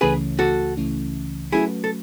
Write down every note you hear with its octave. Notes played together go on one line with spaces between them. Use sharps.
C#2 C#3 E3 A3 C#4 G#4 B4
F#4 A4
C#2 C#3 E3 A3 C#4
F#3 A3 C#4 E4 F#4 G#4 B4
A4